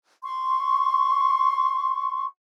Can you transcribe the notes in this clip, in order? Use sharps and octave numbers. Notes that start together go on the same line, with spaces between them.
C6 C#6